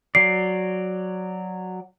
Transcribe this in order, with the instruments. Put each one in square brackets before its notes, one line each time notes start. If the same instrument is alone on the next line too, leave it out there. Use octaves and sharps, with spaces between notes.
[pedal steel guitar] F#3 D5 [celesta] C7